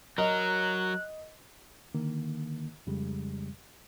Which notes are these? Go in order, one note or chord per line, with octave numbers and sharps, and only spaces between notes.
F#3 A#4 D#5 F#6
D3 D#3 A#3
F2 C#3 G3 G#3